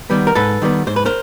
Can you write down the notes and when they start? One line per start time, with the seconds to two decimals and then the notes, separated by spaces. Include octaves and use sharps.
0.10 D#3 G3 B3
0.27 A#4
0.35 G#2 A4 B4
0.62 D#3 G3 B3
0.87 G#2 C5
0.96 B4
1.06 A#4 C5